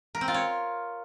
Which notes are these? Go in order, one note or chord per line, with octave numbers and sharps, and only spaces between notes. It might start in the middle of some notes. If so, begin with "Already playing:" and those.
A#4
C4
F4
C#5